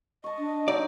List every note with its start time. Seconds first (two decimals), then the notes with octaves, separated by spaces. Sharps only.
0.24 D#5 A5 C#6
0.39 D4
0.68 F#3 D#4 D5